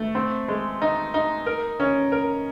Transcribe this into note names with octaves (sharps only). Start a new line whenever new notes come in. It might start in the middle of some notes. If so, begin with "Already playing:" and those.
Already playing: A3
C4
G#3
D#4
D#4
A#4
C#4
A#4